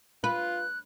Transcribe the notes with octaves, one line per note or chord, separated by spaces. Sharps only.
F4 B4 F#6